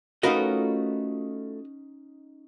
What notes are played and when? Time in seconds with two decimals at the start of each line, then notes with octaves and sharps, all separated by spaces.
0.23 A3 C#4 D#4 F4 F#4 A#4 B4 D#5